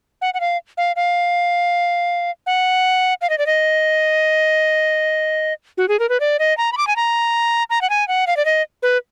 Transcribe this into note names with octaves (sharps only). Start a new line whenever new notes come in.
F#5
F#5
F5
F5
F5
F#5
F5
D#5
D5
D#5
F#4
G#4
A#4
B4
D5
D#5
A#5
B5
D6
G#5
A#5
A#5
F#5
G#5
F#5
F5
D5
D#5
B4